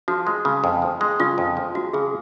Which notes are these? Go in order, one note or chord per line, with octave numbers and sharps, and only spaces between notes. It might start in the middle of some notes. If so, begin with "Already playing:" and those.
F3 F#4
G#3
C#3
F2
F3
G#3
C#3 F4
F2
F3
G#3 F#4
C#3 G#4